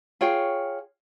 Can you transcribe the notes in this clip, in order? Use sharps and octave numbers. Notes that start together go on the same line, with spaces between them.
F4 G#4 C#5 G5